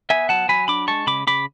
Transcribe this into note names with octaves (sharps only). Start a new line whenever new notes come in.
B3 E5 G#5
F#3 F#5 A5
F#3 G#5 B5
D4 B5 D6
G#3 A5 C#6
C#3 B5 D6
C#3 B5 D6